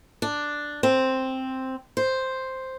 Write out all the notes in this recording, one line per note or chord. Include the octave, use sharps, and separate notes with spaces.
D4
C4
C5